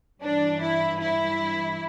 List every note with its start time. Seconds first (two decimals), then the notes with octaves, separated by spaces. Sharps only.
0.24 G2 E3 D4
0.62 E4
1.00 E4